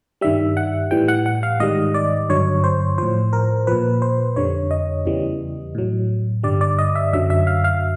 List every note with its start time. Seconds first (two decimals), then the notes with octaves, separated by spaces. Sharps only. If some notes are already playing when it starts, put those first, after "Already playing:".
0.21 G2 D#3 G3 E5
0.57 F#5
0.91 A2 E3 G3 G5
1.08 F#5
1.26 F#5
1.43 F5
1.60 G#2 D#3 G3 D#5
1.94 D5
2.29 G2 D3 F#3 C#5
2.64 C5
2.98 A2 F3 C5
3.33 A#4
3.67 A#2 F3 B4
4.02 C5
4.36 F2 D3 G3 C#5
4.71 D#5
5.06 E2 C#3 E3 G3
5.75 A2 F#3
6.43 G2 D3 G3 D5
6.61 D5
6.79 D#5
6.96 E5
7.13 F#2 D3 F#3 E5
7.30 E5
7.47 F5
7.64 F5